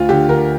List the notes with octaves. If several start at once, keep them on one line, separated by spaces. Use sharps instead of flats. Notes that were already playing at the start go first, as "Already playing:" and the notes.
Already playing: D2 F4
D3 G4
D3 A#4